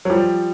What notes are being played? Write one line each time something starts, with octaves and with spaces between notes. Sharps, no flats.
F#3
F3 G3